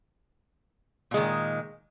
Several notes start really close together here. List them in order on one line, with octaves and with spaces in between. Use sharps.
A#2 G#3 D#3